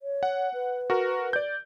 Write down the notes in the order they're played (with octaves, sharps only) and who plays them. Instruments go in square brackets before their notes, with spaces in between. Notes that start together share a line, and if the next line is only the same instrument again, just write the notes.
[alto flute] C#5
[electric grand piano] F#5
[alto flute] B4
[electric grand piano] F#4 A#4
D5 G6